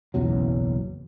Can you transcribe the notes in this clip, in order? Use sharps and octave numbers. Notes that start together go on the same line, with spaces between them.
F#1 B1 E2 F#3